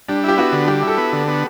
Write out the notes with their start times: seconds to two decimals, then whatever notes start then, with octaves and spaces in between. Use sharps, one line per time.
0.08 G3 D4
0.24 E4 G4
0.37 B3 F#4
0.52 D3
0.68 G3 G4
0.82 E4
0.87 A4
0.98 B3
1.13 D3
1.28 B3